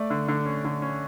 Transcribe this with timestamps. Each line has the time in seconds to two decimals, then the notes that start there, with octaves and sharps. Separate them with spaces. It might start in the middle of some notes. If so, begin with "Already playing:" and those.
Already playing: A3 D5
0.10 D3
0.28 D3
0.45 C#4
0.65 D3
0.82 C#4